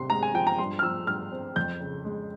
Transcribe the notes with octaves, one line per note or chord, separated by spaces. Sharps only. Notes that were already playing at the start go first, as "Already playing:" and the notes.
Already playing: C3 C6
G#3 A#5
G#5
F3 G5
A#5
G2 C6
F6
F3 E6
G2 F6
C4
F2 G6
C#3
G#3